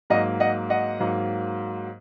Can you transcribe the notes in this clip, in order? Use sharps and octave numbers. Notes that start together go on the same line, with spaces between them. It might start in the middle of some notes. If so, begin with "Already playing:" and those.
G#2 F#3 A#3 D#5 F#5
D#5 F#5
D#5 F#5
G#2 F#3 A#3